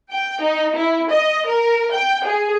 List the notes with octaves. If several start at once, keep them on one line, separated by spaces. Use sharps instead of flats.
G5
D#4
E4
D#5
A#4
G5
G#4